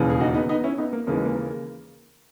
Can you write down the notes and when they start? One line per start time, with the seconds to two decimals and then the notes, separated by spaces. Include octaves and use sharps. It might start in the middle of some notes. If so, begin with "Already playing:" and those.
Already playing: E1 D#2 C#3 E3
0.10 G#4
0.20 D#4 F#4
0.34 B3 D#4
0.49 B3 D#4
0.64 C#4 E4
0.78 B3 D#4
0.93 A#3
1.07 D#2 C#3 E3 A#3
1.15 G#3
1.25 A#3
1.35 A#3